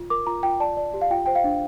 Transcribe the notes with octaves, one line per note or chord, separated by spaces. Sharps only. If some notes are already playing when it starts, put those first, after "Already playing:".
Already playing: F4
A#4 D6
F4 A#5
F4 G5
D5 A5
D5
G4
F5
F4 G5
C5 G5
F5
D4